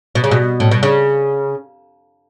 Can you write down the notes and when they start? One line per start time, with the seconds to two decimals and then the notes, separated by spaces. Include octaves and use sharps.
0.15 B2
0.24 C#3
0.31 B2
0.60 A2
0.71 B2
0.83 C#3